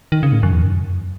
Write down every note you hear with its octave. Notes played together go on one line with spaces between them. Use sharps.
D#3
C#3
A2
F#2
E2
F#2